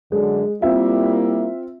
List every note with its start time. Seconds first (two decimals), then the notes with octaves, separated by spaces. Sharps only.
0.12 F#2 D3 G#3
0.62 G3 A#3 C4 E4 F4 E5